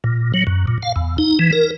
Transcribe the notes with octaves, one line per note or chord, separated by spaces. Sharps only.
A#2
F#3
F#2
A#2
F5
E2
D#4
E3
A#4